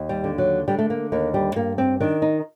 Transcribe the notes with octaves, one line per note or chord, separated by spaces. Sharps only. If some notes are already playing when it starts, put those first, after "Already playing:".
Already playing: D#2
G3
D3
F#3
D3 G3
A3
A#3
D#2 A#3
G3
G2 A#3
C4
D#3 D4
D#4